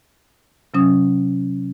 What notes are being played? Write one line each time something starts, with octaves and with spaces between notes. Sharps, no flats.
C3 F#3 C#4 D#6